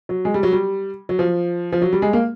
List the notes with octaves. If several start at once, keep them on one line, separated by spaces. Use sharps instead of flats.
F#3
G#3
G3
F#3
G3
F#3
F3
F3
F#3
G3
G#3
A#3